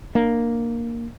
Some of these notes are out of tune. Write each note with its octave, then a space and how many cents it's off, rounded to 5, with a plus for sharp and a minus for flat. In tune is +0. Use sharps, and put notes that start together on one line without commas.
A#3 +0 D4 +30